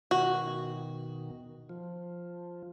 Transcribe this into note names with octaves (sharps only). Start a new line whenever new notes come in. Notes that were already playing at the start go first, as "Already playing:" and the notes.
B2 D#3 F#4
F3